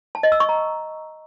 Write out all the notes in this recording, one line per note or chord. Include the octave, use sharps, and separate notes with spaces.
A5
D#5
E6
C#6
A#5